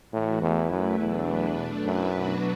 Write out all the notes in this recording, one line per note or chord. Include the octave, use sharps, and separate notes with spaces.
A2 E3 A3 F#4
E2 A3 E4 B4
F#2 A3 E4 B4
E2 B2 F#3 A3 D4
F#3 D4 B4
B2 A3 D4
F#2 A3 E4 B4
B2 F#3 D4 F#4 B4